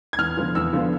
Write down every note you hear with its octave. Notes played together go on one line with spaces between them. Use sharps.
G#6
E2 F6
D3 F3 B3 F4
E2 E6
D3 F3 B3 F4